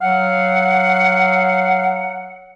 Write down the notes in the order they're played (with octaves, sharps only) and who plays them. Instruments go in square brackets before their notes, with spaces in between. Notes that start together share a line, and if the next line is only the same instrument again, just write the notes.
[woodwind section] F#3 F5 F#5